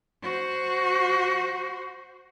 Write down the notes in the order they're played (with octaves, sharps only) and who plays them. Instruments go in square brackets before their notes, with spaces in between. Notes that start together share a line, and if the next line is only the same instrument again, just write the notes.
[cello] F#4 C5